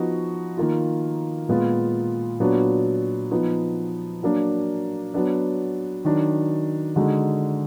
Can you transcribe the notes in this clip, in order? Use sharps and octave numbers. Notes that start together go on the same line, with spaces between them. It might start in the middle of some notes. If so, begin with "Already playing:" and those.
Already playing: F3 B3 D#4 F#4
D#3 A#3 F4
A#2 G#3 B3 F4
A#2 F#3 B3 D4 F#4
F3 B3 D#4
F#3 A#3 D4
F#3 B3 D4
D#3 F#3 D4
D3 G#3 D#4 F#4